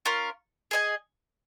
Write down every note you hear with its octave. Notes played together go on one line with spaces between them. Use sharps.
C#4 F4 A#4
G#4 D#5 G#5